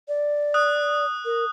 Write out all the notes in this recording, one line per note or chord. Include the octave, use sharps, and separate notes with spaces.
D5
D#6 F#6
A#4